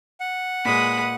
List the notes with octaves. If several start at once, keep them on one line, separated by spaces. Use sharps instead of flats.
F#5
A#2 G#3 B4 B5 D#6